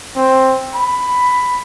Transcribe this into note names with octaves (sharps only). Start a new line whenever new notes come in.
C4
B5